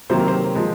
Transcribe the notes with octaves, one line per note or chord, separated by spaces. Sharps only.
C3 D#3 F#3 A#3 C5
A#4
C5
F3 G#3